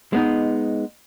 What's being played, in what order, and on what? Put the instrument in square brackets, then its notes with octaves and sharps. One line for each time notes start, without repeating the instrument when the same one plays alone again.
[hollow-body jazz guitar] G#3 B3 D#4